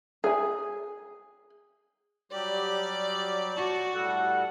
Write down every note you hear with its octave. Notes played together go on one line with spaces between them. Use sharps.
G#4 G#5
F#3 G3 G4 D5
F#4 A5 C#6
A2 G3 A4 F#5